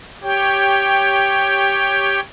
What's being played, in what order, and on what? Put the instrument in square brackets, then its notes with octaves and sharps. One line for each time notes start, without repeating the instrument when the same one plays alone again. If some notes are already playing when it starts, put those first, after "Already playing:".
[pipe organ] G4 C#5 G5